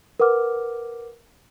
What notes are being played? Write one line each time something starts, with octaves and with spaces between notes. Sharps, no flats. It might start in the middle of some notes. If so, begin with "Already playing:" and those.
A#4 B4 F#5 D6 F6